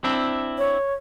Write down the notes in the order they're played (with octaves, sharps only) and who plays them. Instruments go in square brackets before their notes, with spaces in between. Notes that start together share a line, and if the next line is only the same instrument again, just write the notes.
[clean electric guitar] C4 D4 E4
[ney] C#5